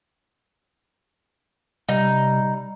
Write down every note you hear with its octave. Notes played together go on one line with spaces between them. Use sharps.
C3 G3 D#4